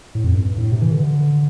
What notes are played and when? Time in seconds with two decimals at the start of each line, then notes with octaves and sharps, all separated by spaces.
0.15 A2
0.24 F2
0.34 G2
0.58 A2
0.72 C3
0.82 E3
0.92 D3